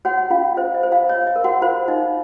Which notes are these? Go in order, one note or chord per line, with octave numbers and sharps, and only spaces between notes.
F#4 C#5 F#5
C#4 F4 F5
C5 D#5
D#5
C5
F4 F5
C#5 D#5
D#5
A#4
F#4 F#5
F4 C5 F5
D#4 D#5